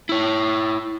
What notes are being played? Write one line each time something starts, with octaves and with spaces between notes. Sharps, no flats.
E4 C#5